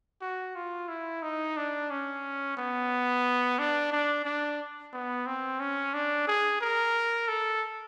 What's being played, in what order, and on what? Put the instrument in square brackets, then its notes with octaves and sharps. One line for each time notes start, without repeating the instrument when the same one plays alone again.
[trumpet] F#4
F4
E4
D#4
D4
C#4
B3
D4
D4
D4
B3
C4
C#4
D4
G#4
A#4
A4